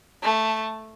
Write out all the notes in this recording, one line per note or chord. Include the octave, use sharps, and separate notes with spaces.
A3